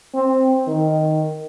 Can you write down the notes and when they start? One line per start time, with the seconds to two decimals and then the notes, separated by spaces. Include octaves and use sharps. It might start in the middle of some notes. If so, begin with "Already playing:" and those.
0.14 C4
0.68 D#3